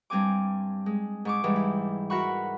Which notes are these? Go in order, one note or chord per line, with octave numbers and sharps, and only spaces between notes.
G2 G3 C4 G#5 D6
G#3
G#2 C#6 D6
G#2 E3 G3
E4
F#4 A#4 E5 F#5 B5 C#6